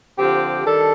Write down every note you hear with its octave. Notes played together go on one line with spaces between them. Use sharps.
D3 F3 C4 G4
D#3 G3 D4 A4